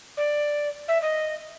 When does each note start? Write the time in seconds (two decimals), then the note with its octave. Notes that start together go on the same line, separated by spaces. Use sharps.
0.17 D5
0.88 E5
1.01 D#5